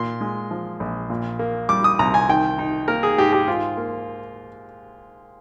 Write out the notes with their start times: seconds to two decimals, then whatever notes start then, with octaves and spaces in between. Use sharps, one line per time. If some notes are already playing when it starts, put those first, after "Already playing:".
Already playing: A#2 C6
0.21 G#3
0.51 F3
0.80 A#1
1.10 A#2
1.39 A#3
1.69 G3 D6
1.84 D#6
1.99 C2 A#5
2.14 G#5
2.29 D#3 G5
2.59 D#4
2.88 A#3 A#4
3.03 G#4
3.18 G#2 G4
3.33 G4
3.48 G#2 F4
3.77 A#3